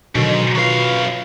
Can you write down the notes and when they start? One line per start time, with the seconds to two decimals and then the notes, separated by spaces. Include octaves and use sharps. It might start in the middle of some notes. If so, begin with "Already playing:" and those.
0.15 G#2 B2 D3 D#3 F#3
0.55 F#2 F4 B4 F5 C#6